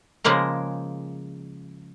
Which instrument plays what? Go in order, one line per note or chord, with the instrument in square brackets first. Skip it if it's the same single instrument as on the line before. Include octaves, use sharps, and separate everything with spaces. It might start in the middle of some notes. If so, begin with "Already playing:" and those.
[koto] C#3 F3 G#3 A#3 A#4